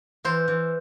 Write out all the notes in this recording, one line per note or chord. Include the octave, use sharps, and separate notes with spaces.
E3 C5
E3